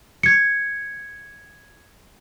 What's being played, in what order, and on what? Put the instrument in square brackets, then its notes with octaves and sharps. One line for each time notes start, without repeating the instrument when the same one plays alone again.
[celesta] G#6 C#7